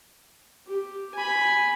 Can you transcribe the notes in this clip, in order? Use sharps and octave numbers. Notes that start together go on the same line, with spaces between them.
G4
G#5 B5